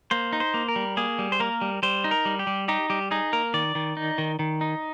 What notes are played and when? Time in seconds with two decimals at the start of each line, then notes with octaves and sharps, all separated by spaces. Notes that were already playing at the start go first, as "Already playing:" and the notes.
0.11 A#3 C5
0.33 D#4
0.40 C5
0.54 A#3
0.69 A#4
0.76 G3
0.97 A#3 G#4
1.19 G3
1.32 C5
1.40 A#3 A#4
1.61 G3
1.83 G3 C5
2.04 D#4
2.11 A#4
2.25 G3
2.39 G4
2.47 G3
2.68 D#4 G4
2.90 G3 G4
3.11 D#4 G#4
3.33 A#3 A#4
3.54 D#3 D5
3.75 D#3
3.97 D#4
4.18 D#3
4.39 D#3
4.61 D#4